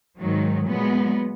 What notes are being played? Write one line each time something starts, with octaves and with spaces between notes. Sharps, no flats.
G#2 D#3 F#3
A#2 F#3 G#3 B3